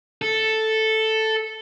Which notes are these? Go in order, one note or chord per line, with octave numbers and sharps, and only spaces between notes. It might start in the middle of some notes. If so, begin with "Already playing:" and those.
A4